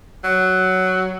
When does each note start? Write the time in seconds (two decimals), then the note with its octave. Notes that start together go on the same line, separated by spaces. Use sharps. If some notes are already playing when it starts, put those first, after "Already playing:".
0.24 F#3